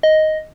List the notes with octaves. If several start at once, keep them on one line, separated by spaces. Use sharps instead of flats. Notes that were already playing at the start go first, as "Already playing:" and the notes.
D#5